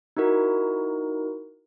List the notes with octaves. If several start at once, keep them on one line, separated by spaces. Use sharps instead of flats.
D#4 E4 F#4 A#4